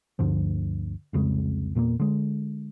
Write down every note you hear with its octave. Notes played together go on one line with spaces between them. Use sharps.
D2 G2 D3 F3
C2 F2 C#3 G#3
E2 A#2 A3 A#3
D3 G#3